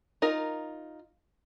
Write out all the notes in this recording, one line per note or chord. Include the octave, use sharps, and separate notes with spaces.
D#4 F4 A#4